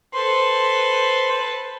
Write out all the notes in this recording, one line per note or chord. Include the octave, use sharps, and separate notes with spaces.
A4 B4 C5 C6